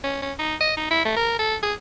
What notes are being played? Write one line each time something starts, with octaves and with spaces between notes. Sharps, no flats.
C#4
C#4
D#4
D#5
D#4
E4
A3
A#4
A4
G#4